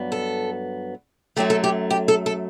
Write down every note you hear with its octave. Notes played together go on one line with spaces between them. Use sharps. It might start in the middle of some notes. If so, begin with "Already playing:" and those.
Already playing: G2 F#3 B3
A4
F#2 F#3 A3 G4
A4
G4
G4
A4
A4